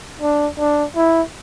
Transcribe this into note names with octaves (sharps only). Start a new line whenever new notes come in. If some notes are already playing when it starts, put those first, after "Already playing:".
D4
D4
E4